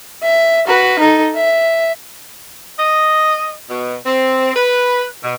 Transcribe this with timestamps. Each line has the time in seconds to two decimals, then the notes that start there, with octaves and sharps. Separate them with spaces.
0.23 E5
0.67 F#4 B4
0.99 D#4 A4
1.36 E5
2.79 D#5
3.69 B2
4.05 C4
4.56 B4
5.23 B2